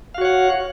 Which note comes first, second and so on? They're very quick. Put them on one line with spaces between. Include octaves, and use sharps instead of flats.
F5 F#4 C#5 F#5